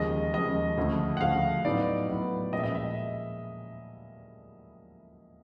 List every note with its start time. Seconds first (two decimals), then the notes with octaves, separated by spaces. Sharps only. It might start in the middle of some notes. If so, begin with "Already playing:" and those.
Already playing: D#2 C#3 F3 G#3 D#5
0.33 D#2 C#3 F3 G#3 D#5
0.78 D2 C#3 F3 A3
1.17 F#5
1.21 D2 C#3 F3 A3 F5
1.65 A2 F#3 B3 D#4 D5
2.09 A2 F#3 B3 D#4
2.53 A#2 F3 G#3 C#4 D#5
2.59 E5
2.64 D#5
2.75 E5